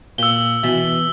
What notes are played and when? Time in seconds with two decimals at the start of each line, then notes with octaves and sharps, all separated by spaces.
0.18 A#2 E6 G7
0.63 B2 E3 A5